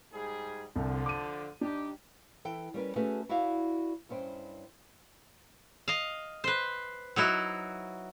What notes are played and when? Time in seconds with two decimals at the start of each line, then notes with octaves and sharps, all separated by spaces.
0.13 G#2 G3 G#4
0.76 C2 D3 F3
1.06 D6 D#7
1.61 G3 D4 D#4 G4
2.45 E3 A4 G5
2.74 G3 C#4 A#4 B4
2.96 A3 C#4 F#4 G#4 A4 B4
3.29 E4 F#4 D5 E5 F5
4.09 G2 C#4 E4 C5 G5
5.88 D#5 F5
6.44 B4 C5
7.16 F#3 D#4 E4 F#4